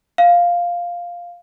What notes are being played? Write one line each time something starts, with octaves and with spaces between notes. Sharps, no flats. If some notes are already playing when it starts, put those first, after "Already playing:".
F5